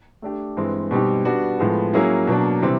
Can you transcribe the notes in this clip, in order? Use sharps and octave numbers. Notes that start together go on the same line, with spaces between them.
A3 D4 G4
G2 E3 G#3 C4
B2 G3 C4 D#4 G4
G3 B3 D4 F#4
A2 F3 G#3 B3
F#3 A#3 C#4 E4 G#4
B2 F#3 A#3 D4
C3 E3 G3 C4